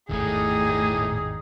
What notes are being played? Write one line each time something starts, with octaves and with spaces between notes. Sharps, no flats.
G#1 E2 A2 G3 A3 D#4 G#4 D#6